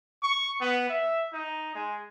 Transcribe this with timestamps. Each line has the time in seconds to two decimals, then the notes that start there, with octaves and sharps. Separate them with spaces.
0.23 C#6
0.61 B3
0.89 E5
1.33 D#4
1.75 G#3